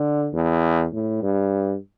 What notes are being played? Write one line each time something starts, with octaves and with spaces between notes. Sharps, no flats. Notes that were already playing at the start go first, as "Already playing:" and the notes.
Already playing: D3
E2
A2
G2